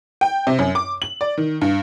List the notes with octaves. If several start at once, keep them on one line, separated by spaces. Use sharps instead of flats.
G5
C3
F#2
D6
F#7
D5
D#3
G2